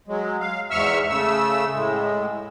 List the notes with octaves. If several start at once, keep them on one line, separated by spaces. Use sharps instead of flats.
F#3 G#3
F5
E2 G#2 E5 C#6 E6 F6
C#3 A3 E6
A2 G#3